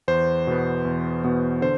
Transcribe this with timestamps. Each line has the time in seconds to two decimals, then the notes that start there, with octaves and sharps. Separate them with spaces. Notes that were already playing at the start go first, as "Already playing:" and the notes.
0.08 E2 C5
0.47 B2 B3
0.85 E2
1.24 B2 B3
1.62 D3 C5